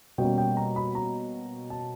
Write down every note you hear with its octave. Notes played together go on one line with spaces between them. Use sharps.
B2 G3 A#3 C#4 G5
G5
A#5
B5
A#5
A5